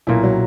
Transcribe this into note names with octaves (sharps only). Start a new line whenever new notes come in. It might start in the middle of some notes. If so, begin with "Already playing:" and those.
B1 A#2 A#3 E4
F#3